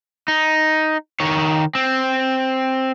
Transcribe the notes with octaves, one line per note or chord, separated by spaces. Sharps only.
D#4
D#3 C#5
C4